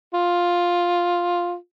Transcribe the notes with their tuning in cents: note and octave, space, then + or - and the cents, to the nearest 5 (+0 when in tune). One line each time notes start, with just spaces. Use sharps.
F4 +5